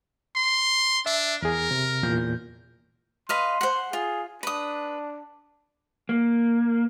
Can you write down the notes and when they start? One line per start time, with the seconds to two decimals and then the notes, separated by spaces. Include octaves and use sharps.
0.36 C6
1.06 D4 E5
1.42 E2 G#4 A#4
1.71 C3
2.03 E2 A#2 G6
3.29 B4 D#5 F5 C6
3.61 C5 F#5
3.93 F4 G#4
4.43 D4 B4 D#6
6.09 A#3